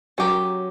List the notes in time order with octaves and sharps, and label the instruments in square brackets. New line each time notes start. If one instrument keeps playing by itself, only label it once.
[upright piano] F#3 [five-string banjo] C#4 G4 A#4